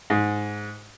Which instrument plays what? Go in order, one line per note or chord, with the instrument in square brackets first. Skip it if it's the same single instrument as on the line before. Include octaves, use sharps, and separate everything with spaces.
[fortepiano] G#2